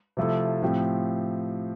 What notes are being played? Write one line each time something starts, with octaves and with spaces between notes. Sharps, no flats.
C3 F3 A3 E4 A4
A2 F3 C4 G4